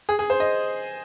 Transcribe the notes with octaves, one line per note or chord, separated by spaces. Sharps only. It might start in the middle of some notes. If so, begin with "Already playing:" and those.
G#4
G#4
C5
D#5